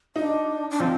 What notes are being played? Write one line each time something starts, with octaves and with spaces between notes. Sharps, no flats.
D4 D#4
D4
F3 C4